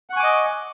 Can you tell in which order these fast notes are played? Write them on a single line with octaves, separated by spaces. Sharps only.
F#5 C#6 G#5 D6 D#5